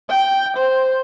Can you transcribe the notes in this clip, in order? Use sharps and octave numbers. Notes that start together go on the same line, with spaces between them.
G5
C5